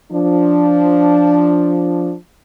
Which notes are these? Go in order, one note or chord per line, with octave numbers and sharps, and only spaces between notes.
F3 D4